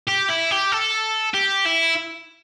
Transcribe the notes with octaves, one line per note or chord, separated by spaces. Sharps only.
G4
E4
G4
A4
G4
E4